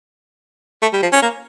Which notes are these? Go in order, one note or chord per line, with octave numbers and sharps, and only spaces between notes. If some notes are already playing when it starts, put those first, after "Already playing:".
A3
G3
F3
C#4
A#3